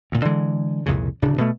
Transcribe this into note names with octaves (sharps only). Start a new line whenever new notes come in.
D2 A#2
D3 E3 G#3
C2 F2 A#2 C#3
D1 D2 C#3 D4
B2 A3